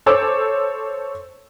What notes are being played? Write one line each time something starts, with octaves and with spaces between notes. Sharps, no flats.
A4 C5 C#5 D6 E6